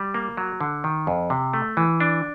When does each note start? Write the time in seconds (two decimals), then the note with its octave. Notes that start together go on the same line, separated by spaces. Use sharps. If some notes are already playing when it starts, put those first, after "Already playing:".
Already playing: G3
0.14 A#3
0.37 F#3
0.61 D3
0.84 D#3
1.07 F2
1.30 C3
1.53 A3
1.77 E3
2.00 D4